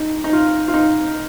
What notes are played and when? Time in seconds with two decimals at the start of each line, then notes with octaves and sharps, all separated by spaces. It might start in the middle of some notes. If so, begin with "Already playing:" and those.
Already playing: D#4
0.24 D#4
0.33 F4
0.68 F4
0.74 D#4